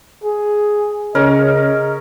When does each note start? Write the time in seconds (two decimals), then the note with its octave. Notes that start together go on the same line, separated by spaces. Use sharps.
0.24 G#4
1.15 C#3 C#4 A#4 D#5